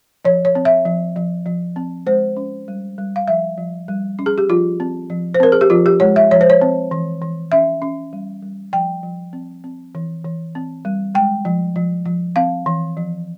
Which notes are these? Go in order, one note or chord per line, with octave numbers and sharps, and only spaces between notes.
F3 C#5
C#5
C4
E5
F3
F3
F3
C4
G#3 C5
C#4
G3
G3
F5
F3 E5
F3
G3
C#4
G#4
G4
F3 F4
C4
F3
C5
C4 A#4
G#4
G4
F3 F4
G4
G#3 C#5
E5
F3 C#5
C5
C#5
C4
E3
E3
C#4 E5
C#4
G3
G3
F3 G5
F3
C4
C4
E3
E3
C4
G3
G#3 G5
F3
F3
F3
C4 F5
E3
F3